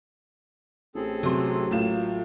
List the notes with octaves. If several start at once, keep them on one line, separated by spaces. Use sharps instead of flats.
A1 C4 G#4 A4
C3 F#3 C6
A2 A#3 F4 E7